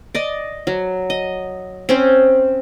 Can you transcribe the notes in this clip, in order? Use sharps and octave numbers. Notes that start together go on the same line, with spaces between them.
D5 D#5
F#3
D#5
C4 C#4 C5